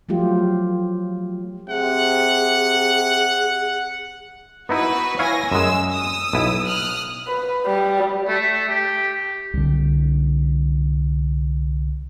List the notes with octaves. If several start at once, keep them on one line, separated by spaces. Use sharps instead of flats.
F3 F#3 A3 F4 G4
C3 G#4 F#5
B3 D#4 E4 F#4 B4
E4 C#5 F5 G#5 A#6
F#2 G#3 E6
D#6 E6
B1 E4
D#6 F6 F#6
B4
G3
A3
G4
C2 D3